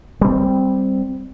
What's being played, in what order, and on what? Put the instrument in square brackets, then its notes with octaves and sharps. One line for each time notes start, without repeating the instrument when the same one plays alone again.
[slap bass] G3 C4